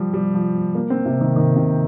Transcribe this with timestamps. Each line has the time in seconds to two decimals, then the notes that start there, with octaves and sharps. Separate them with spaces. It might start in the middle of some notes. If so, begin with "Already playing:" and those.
Already playing: F3 G3
0.14 G3
0.34 F3
0.75 A#3
0.90 C4
1.06 C3
1.21 D#3
1.36 D#3
1.56 C3